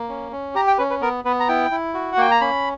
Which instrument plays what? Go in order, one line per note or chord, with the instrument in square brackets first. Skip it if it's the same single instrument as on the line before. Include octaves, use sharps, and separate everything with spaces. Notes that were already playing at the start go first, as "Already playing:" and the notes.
Already playing: [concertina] A#3
C#4
C#4
G4 A#5
G5
C#4 B4
B4
B3 A#4
B3 B4
A#5
E4 G5
E4
F#4
F#5
A#3 G5
A#5
C#4 B5